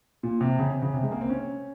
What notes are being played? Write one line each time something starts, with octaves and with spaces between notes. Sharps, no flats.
A#2
C3
C#3
C4
C#3
C3
G#3
A#3
C4
C#4